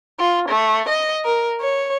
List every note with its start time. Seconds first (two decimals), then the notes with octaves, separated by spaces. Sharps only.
0.20 F4
0.49 A3
0.89 D#5
1.25 A#4
1.61 C#5